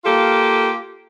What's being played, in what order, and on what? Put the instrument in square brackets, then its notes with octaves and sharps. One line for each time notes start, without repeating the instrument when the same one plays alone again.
[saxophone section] A#3 F4 G4 A4